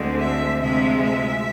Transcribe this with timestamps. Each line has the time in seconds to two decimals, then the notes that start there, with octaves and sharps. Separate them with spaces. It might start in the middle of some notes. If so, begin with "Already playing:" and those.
Already playing: D2 D3 G#3 C4
0.20 E5
0.59 D2 C3 F3 G#3 E5
1.00 E5